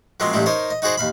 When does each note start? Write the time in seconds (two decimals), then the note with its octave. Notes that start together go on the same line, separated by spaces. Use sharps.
0.20 F3 F#3 G#3 A#3 C4 C#4
0.33 A1 G2 D#3 G3 E4
0.46 D#4 A#4 C5 C#5
0.70 D#5
0.82 D#4 F#4 G#4 C5 D5
0.97 D#2 F5 B5